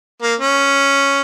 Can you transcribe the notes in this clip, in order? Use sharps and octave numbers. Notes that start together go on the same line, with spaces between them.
A#3
C#4